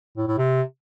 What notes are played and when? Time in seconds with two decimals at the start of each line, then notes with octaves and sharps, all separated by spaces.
0.17 A2
0.27 A2
0.38 C3